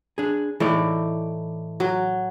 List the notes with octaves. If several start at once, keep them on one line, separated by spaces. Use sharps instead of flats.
D4 G#4
A2 E3 D#4 D5
F#3